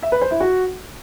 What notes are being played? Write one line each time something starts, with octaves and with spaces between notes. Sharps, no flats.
E5
B4
C5
E4
F#4